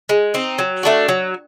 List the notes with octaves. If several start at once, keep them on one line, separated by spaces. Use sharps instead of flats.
G#3
C4 D#4
F#3
A3 D4 F#4
F#3